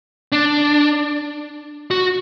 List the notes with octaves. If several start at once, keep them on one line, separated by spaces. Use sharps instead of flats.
D4
F#4